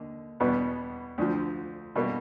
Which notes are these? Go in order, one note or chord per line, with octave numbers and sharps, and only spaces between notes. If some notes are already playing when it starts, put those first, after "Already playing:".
Already playing: D#2 D3
E2 B2 G3 B3
D2 D3 F3
B2 G3 A#3